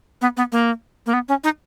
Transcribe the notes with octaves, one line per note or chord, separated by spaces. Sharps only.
B3
B3
A#3
A#3
B3
C#4
D#4